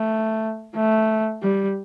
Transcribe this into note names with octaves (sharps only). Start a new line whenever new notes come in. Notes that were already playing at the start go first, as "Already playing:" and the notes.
Already playing: A3
A3
G3